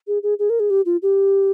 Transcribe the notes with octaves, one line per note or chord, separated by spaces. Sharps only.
G#4
G#4
G#4
A#4
G#4
G4
F4
G4